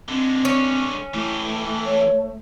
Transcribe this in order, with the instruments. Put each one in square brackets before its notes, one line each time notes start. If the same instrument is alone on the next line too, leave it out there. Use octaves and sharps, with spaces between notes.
[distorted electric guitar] D3 G#3 [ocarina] C4
[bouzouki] C#4
[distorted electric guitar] E3 G4 [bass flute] A3 [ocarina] E4
[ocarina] C#5